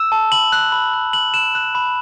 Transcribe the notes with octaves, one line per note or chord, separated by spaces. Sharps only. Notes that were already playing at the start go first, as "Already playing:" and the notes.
Already playing: E6 E7
A5
B5 F#7
F#6
B5
F#6
F#6 F#7
F#6 E7
F#6
B5